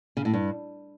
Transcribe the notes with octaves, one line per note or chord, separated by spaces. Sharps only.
C#3
A2
G2